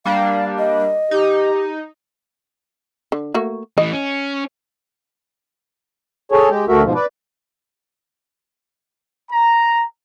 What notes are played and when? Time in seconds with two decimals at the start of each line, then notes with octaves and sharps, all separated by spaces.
0.06 G3 A#3 D4 F5
0.58 D#5
1.11 D#4 G4
3.12 D3
3.34 A3 A#3 F#4
3.78 E3 A3 D#5
3.93 C#4
6.32 G#4 A4 C#5
6.49 G#3 G4
6.68 D2 A3 F#4 A#4 E5
6.82 G#2 B2 F3
6.95 B4 D5
9.31 A#5